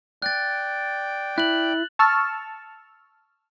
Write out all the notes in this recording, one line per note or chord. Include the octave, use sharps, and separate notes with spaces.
D5 G5 F#6 A6
E4 F#6 F#7
A5 C#6 E6 F6